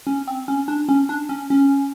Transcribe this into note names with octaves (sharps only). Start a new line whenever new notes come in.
C#4
C4
C#4
D4
C#4
D4
C#4
C#4